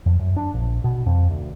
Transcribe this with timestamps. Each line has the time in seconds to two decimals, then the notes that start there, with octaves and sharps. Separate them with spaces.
0.06 F2
0.19 F#2
0.37 D4
0.54 A#1
0.84 B2
1.06 F2
1.30 D2